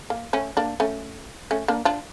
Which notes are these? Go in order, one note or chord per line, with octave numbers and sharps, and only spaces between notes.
A#3
A3 C#4
A#3 D4
A3 C#4
A3 C#4
A#3 D4
D4 F4